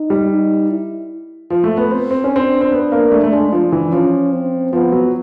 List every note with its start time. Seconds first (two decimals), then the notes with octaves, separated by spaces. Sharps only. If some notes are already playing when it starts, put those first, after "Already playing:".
Already playing: D#4
0.10 G3
0.29 D#4
0.70 E4
1.50 F3
1.64 A3
1.77 B3
1.91 C4
2.11 C4
2.24 C#4
2.31 C4 D4
2.61 C4
2.72 B3
2.92 A#3
3.11 A3
3.24 A3
3.32 G#3
3.52 F3 D4
3.72 E3
3.92 F3 C#4
4.33 C4
4.73 F3 B3
4.92 F#3